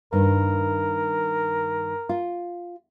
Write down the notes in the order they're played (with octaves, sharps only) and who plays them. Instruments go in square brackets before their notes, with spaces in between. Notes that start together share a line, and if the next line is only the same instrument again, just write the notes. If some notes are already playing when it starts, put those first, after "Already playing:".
[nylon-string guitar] G2 D#3 [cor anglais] A#4
[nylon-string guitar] F4